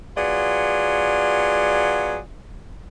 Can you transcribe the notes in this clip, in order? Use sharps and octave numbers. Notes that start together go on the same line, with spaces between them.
F#3 B3 F4 G#4 D5